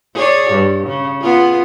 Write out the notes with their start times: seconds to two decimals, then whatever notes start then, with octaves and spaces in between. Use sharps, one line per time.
0.14 G#4 C#5 D5
0.51 G2
0.87 C#3
1.21 B3 F4 G#4